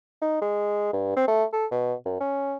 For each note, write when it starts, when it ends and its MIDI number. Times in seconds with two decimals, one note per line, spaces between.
0.22 0.41 63
0.42 0.92 56
0.93 1.12 43
1.17 1.24 60
1.28 1.45 57
1.53 1.66 69
1.71 1.94 47
2.06 2.20 42
2.20 2.57 61